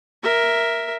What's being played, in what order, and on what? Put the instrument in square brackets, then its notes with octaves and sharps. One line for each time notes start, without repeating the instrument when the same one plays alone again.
[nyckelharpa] A#4 E5